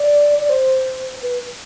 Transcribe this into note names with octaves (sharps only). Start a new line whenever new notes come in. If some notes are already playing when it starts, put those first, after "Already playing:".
Already playing: D5
D5
C5
B4